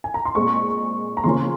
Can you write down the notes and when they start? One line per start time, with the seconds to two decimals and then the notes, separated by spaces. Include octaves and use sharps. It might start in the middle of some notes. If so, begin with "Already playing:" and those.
0.04 G#5
0.14 A#5
0.25 C6
0.35 A#2 G#3 C4 C#6
1.17 A#5
1.24 C#3 F3 A#3 C#4 C6